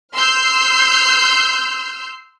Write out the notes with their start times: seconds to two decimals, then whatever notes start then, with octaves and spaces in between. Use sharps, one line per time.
0.14 C6 E6 F6 G6 C7